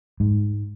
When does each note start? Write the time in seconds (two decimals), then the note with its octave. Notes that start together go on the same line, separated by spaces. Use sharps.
0.20 G#2